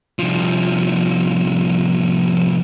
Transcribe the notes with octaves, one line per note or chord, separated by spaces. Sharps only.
C2 F3